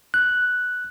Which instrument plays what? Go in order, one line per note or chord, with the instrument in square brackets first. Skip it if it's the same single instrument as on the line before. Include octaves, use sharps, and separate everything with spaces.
[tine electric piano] F#6